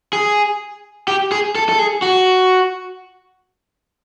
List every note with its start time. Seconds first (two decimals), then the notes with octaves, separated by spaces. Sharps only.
0.13 G#4
1.08 G4
1.32 G#4
1.55 A4
1.69 A4
1.79 G#4
2.02 F#4